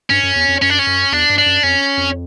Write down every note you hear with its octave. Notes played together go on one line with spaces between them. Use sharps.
G2 C#4
F#2
E2
F2
F#2 C#4
D4
C#4
F#2
E2 D4
G2
D4
F#2
F2 C#4
F2